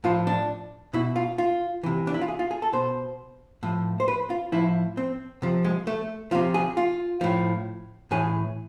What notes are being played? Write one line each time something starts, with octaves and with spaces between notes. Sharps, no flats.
A2 F3 F4
D4
B2 E4
F4
F4
C3 E3
D4
E4
F4
G#4
F4
G#4
A4
B2 C5
A2 F3
C5
B4
F4
A2 F3 E4
C4
C3 F3
G#3
A3
C3 F3 F4
G#4
F4
A2 F3
A2 E3 G#4